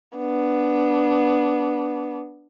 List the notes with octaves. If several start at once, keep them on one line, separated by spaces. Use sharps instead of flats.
B3 D4